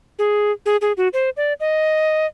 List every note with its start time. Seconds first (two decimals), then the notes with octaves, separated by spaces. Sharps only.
0.19 G#4
0.66 G#4
0.81 G#4
0.97 F#4
1.13 C5
1.37 D5
1.60 D#5